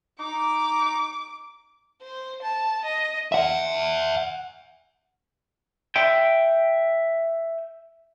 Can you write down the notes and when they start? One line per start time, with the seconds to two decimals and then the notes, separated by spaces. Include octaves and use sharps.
0.19 D#4 D6
2.02 C5
2.42 A5
2.85 D#5
3.32 E5 F#5
5.96 E5 G5